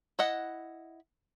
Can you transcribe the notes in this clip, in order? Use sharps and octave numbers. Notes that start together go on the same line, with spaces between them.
E4 D#5 F#5